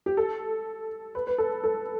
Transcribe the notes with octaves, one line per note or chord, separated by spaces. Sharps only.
G4
A4
B4
B4
A4
A4